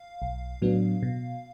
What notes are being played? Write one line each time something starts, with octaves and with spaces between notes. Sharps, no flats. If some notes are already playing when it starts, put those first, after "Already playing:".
Already playing: F5
B1
A2 F#3 B3 D4
B2